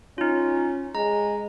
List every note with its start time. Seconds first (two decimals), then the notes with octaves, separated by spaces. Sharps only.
0.18 C#4 D#4 F4
0.95 G#3 A#5